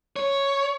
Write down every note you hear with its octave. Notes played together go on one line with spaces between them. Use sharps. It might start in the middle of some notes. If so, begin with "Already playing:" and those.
C#5